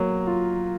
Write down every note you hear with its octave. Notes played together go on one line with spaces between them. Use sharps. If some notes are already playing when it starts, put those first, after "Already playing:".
Already playing: F#3 A#3
F4